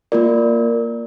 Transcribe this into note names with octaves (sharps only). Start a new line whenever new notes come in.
A#3 F4 A#4 D5